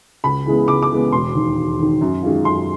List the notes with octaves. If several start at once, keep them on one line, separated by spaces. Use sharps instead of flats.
C#2 B5
C#3 E3 G#3 B3
C#2 D6
D6
C#3 E3 G#3 B3
E1 C6
D#2 D#3
E1
D#2 D#3
F#2
D#3 G#3 C#4 F4
F#2 C6